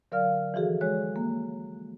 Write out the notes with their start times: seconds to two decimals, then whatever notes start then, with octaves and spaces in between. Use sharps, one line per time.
0.12 D3 F#3 A#4 D5 F5 F6
0.54 E3 F3 F#4 G#4 A4
0.81 G#3 C#5 F#6
1.16 A#3